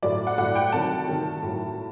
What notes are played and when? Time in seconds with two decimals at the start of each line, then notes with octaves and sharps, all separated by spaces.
0.02 A2 F#3 D5
0.27 F#5
0.38 A2 F#3 F#5
0.55 G5
0.72 C3 D#3 F#3 A5
1.08 C3 D#3 F#3
1.43 A2 F#3